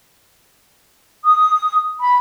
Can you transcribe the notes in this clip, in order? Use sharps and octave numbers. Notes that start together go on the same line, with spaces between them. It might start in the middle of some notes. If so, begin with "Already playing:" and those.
D#6
B5